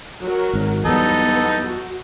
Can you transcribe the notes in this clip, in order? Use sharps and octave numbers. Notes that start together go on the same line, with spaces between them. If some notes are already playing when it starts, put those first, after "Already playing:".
F#3 F#4 A#4
G#1 G#2
E2 F#3 G3 B3 D#4 A4
F#4